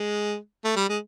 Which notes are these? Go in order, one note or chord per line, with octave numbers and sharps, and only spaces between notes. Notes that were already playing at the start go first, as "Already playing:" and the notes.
Already playing: G#3
A3
G3
G#3